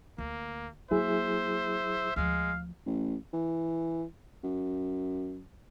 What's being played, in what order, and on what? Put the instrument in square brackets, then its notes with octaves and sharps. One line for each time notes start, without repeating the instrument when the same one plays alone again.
[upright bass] D2 [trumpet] A#3
[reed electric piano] F#3 E4 G#4 [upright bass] A#3 [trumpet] C5 [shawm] E5
[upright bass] D2 F3 [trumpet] G#3 [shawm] F5
[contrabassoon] A1
E3
F#2